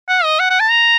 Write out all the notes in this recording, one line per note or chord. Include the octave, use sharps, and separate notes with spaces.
F#5
D#5
F#5
F#5
A5
A#5